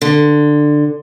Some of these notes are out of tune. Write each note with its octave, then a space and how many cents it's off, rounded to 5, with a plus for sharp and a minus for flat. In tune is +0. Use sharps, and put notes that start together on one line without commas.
D3 +15